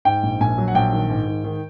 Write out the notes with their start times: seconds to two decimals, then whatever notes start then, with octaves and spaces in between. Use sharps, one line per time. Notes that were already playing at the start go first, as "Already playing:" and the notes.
0.05 G#2 G5
0.23 A#1
0.40 A#1 G#5
0.58 F#3
0.68 F#5
0.75 A#1 G5
0.93 D#3
1.09 G#2
1.27 D#3
1.44 D#3